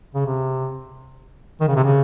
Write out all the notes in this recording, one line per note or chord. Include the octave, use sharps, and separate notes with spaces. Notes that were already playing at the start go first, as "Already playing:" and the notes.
C#3
C3
D#3
C#3
C3
C#3